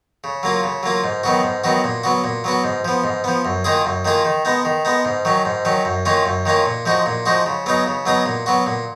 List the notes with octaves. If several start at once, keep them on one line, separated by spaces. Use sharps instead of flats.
C#3
F#3 A#3 F4
C#3
F#3 A#3 F4
G#2
D#3 F#3 B3 F#4
G#2
D#3 F#3 B3 F#4
A#2
F#3 B3 F#4
A#2
F#3 B3 F#4
G#2
F3 B3
G#2
F3 B3
F#2
D#3 A#3 F4 G#4
F#2
D#3 A#3 F4 G#4
D#3
G#3 B3 D#4
D#3
G#3 B3 D#4
G#2
D#3 F#3 C#4
G#2
D#3 F#3 C#4
F#2
D#3 A#3 C#4 F4
F#2
D#3 A#3 C#4 F4
A#2
F3 G#3 D#4 F#4
A#2
F3 G#3 D#4 F#4
C#3
F#3 B3 D#4 G#4
C#3
F#3 B3 D#4 G#4
A#2
F#3 B3 F#4
A#2